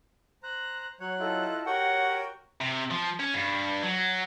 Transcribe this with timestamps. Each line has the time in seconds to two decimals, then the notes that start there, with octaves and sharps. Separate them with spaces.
0.43 C5 A#5 F#6
1.00 F#3 C#5 F#6
1.19 E4 F4 A4 D#5 A5
1.66 F#4 G4 A#4 C#5 F#5 G5 C#6
2.61 C3
2.91 F3
3.20 C#4
3.34 G2
3.83 F#3